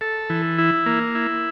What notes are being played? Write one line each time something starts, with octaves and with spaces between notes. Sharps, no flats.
A4
E3
E4
A#3
E4